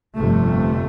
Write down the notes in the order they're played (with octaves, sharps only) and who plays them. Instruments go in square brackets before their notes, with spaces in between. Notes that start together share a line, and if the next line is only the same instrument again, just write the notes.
[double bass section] G1 F2 C3 A3